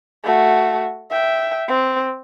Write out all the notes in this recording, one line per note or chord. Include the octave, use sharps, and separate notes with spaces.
A3 F#4
E5 G5
C4